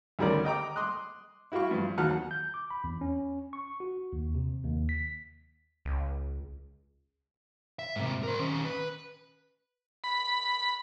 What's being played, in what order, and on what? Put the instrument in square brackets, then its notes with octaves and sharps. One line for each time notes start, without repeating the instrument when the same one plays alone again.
[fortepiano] D2 D#3 G3 C#4 A#4 D5
D#5 G5 A#5 D6
C6 D6 D#6 F#6
E4 F#4 G4 F5 C#6
G2 F3
D#2 F#3 D#4 F#5 A5 F6
[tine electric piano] G6
D6
B5
E2
C#4
C#6
F#4
D#2
C3
D#2
B6
[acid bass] C#2
[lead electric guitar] E5
G#2 C3
A#4 C5
D#3 C#4
B4
[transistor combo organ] B5